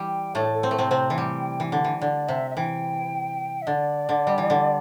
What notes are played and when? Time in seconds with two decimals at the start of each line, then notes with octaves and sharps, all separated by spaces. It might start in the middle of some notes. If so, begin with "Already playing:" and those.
Already playing: E3 G3
0.08 G5
0.35 A2 A3 A4
0.54 A4
0.63 C4
0.71 A3
0.76 C3 C4 C5
0.91 C3 C4
1.10 E3
1.18 G3 G5
1.60 E3
1.72 D3
1.84 E3
2.01 D3 D5
2.28 C3 E5
2.51 E5
2.56 E3 G5
3.62 E5
3.67 D3 D5
4.09 D3
4.27 G3
4.38 E3
4.50 D3